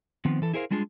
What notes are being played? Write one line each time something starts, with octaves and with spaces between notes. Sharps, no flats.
D#3 F3 B3 C4
E3 A4
E4 G#4 A#4 C5 F5
G3 G#3 D4 F4 G#4